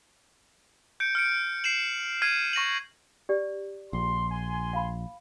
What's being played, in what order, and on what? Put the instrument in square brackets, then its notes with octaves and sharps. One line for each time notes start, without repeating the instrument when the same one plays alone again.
[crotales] G6 C#7 D7
F6 C#7 D7
C7 D7 E7 F#7
F6 G#6 C7 D#7
C#6 A#6 D#7 F#7
[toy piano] G4 D5
[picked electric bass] A#1 [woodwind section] C6
[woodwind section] G#5 C6
[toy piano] F5 B5